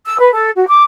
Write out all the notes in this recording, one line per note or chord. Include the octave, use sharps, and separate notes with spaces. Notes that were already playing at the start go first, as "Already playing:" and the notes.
E6
B4
A4
F#4
D6